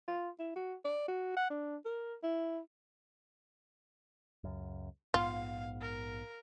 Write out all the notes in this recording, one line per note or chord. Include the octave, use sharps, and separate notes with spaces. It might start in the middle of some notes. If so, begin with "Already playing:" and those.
F4
E4
F#4
D5
F#4
F#5
D4
A#4
E4
C#2 F#2
A#1 G#2 B3 F4 F5
A#4